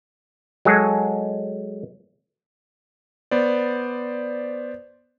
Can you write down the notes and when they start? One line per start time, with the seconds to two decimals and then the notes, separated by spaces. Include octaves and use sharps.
0.65 F#3 G#3 G#4 A4
3.31 B3 C5 D5